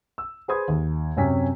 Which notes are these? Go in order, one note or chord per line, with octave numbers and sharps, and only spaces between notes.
E6
G#4 B4 C5 B5 D#6 G#6
D#2
F#2 C3 C#4 G#5 B6